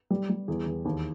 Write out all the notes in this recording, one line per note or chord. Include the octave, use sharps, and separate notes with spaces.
G3
G3
E2 G#4
E2
D#2